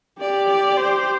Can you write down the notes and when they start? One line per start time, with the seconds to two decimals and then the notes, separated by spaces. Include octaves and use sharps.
0.21 G4 D5
0.49 D5
0.77 C5